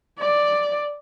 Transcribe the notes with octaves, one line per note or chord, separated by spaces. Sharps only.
D5